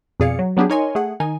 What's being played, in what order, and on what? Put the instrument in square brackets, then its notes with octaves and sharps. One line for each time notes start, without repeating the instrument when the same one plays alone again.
[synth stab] F2 B2 G#4 D5 F5 C#7
F#3
F#3 B3 D4 G4 G#4
D#4 A#4 C#5 D#5 G#5 C6
A3 G#4 F#5
D#3 D#4 G#5